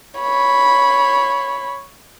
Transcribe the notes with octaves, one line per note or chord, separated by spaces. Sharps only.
C#5 B5